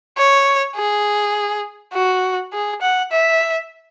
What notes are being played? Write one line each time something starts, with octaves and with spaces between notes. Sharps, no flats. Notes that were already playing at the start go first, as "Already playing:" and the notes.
C#5
G#4
F#4
G#4
F#5
E5